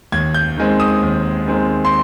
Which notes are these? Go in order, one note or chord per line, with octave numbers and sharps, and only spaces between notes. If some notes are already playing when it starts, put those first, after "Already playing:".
D#2 G#6
G6
D#3 G#3 C4
D#6
D#2
D#3 G#3 C4
C6